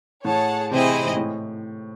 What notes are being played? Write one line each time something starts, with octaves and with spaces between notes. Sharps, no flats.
A2 G#4 C#5 F#5 A5
C3 C4 E4 G#4 D#5
G#2
A2